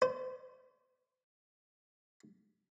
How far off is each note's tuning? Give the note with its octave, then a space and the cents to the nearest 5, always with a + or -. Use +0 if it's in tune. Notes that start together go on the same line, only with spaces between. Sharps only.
C5 -35